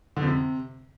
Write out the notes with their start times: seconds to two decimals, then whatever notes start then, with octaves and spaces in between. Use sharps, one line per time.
0.17 D3
0.22 F2
0.27 C3